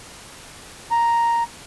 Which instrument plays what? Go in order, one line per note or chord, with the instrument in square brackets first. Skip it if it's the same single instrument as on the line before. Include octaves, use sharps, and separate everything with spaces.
[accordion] A#5